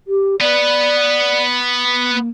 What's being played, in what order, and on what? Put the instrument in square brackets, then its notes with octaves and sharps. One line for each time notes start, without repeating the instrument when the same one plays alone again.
[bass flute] G4
[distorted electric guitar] B3 B4 [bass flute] D5
[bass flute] A#3